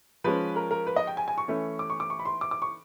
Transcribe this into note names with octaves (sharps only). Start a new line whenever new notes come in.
F3 G#3 C#4 B4
A#4
A#4
B4
D#5
G5
G#5
G#5
C#6
E3 A3 C#4
D6
C#6
D6
C#6
B5
C6
D6
D6
C#6